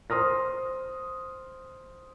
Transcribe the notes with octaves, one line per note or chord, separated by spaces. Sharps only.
C5 C6 D#6 F6 A#6